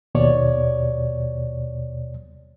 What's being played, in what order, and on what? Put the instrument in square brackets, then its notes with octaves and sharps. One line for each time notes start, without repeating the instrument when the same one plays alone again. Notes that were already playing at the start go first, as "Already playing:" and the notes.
[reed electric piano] D#2 B2 C#5 D5